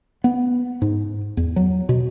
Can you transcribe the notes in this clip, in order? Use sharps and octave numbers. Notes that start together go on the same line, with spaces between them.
B3
G#2
E2
F#3
B2